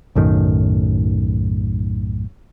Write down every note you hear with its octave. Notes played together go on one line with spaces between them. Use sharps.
B1 F#2 A2 D#3